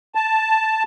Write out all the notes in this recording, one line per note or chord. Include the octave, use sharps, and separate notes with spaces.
A5